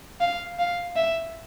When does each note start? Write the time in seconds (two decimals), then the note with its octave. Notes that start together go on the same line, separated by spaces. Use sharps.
0.21 F5
0.59 F5
0.96 E5